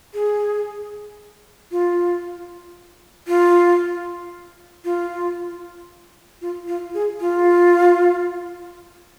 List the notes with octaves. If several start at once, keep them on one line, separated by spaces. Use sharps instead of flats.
G#4
F4
F4
F4
F4
F4
G#4
F4